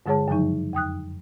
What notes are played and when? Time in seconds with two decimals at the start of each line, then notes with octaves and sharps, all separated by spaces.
0.06 G2 D3 G#3 G#4 C#5 A5
0.28 F#2 C#3 F3 F#3 D#4
0.73 F2 G5 D#6 F#6